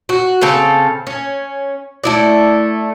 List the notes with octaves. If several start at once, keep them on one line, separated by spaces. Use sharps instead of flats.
F#4
C#3 C4 A4 F5
C#4
A3 E4 D5